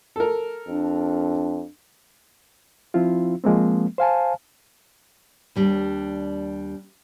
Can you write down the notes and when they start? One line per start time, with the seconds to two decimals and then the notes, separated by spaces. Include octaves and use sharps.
0.16 A4 A#4
0.68 F2 D4
2.94 F3 C4 E4 F4
3.44 F3 G#3 A#3 C4
3.98 C5 F5 G#5 A5
5.56 D#2 G3 D4